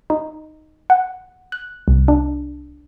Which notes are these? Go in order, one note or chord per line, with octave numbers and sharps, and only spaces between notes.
D#4
F#5
F#6
C2
D4